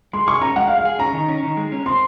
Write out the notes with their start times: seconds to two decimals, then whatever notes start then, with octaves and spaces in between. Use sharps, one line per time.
0.13 G#3 C6
0.27 G#4 C#6
0.41 C#4 A#5
0.56 G#3 F#5
0.67 F5
0.70 G#3
0.78 F5
0.85 G#4
0.99 C#4 A#5
1.13 D#3
1.28 C#4
1.43 D#3
1.57 G#3
1.72 C#4
1.86 C4 C6